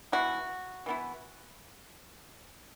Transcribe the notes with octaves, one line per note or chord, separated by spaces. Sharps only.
E3 B3 E4 F#4
E3 B3 E4